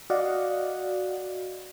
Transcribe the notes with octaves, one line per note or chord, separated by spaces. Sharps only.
F#4 D5 D#5 F5 F#5